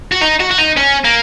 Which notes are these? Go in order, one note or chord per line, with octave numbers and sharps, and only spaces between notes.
F#4
D#4
F#4
F#4
D#4
C#4
A#3